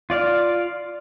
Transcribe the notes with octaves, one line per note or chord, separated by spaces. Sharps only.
F4 D5 F5